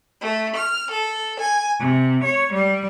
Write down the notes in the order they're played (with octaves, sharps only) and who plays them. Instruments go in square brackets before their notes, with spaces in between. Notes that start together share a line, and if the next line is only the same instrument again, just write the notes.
[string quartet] A3
F6
A4
G#5
C3
C#5
G3